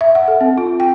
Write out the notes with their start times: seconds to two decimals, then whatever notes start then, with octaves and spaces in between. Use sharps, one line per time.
0.01 E5
0.15 F#5
0.28 A4
0.41 C4
0.58 F4
0.80 G5